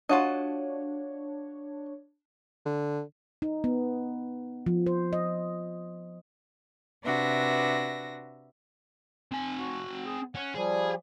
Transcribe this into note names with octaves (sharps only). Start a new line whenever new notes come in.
D4 F4 F#4 C#5 D#5
D3
D#4
B3
F3
C5
D#5
C3 D4 F#4 B4 E5 A#6
C4 G#5
F#4
G#4
C#4 F#5
F3 G3 G#4